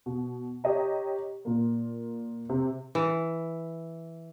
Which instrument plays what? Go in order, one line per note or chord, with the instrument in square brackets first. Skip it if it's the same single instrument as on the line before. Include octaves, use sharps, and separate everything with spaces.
[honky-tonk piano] B2
G4 C#5 D#5 A#5
A#2 A#3
C3
[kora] E3